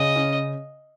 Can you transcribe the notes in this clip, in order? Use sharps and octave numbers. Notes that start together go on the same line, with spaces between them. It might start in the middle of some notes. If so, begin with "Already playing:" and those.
Already playing: C#3 D#5
C#4